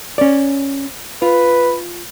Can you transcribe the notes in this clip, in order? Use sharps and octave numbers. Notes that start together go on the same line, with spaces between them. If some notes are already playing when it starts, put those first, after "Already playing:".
C#4 D5
F4 B4